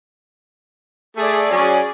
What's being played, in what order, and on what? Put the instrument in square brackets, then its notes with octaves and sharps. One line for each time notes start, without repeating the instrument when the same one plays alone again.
[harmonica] A3 A4 [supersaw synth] G#4 D5
[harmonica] F#3 C#4 C#5